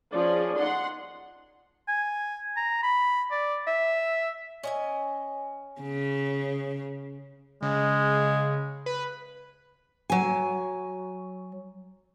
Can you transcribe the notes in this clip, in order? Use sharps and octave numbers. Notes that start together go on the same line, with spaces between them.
F3 C#4 G#4 D5
D#4 F#5 C6
G#5
A#5
B5
D5
E5
C#4 D#5 G#5
C#3
C#3 G#3
B4
F#3 G#5